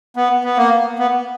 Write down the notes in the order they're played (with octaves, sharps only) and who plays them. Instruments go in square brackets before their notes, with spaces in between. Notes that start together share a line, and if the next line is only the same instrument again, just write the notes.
[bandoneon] B3
B3
A#3
B3